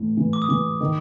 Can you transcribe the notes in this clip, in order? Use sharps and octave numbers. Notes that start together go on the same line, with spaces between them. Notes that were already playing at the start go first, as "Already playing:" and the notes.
Already playing: A2 E3
E3
D6
D#6
E3 D6
D#3